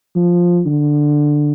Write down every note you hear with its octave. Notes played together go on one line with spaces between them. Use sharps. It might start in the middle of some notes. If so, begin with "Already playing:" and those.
F3
D3